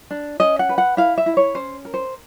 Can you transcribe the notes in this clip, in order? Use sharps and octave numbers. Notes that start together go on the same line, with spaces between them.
D4
C#4 D#5
F#5
B4
F#5
E4 F5
E5
E4
C#5
C#4 C5
A#4
C5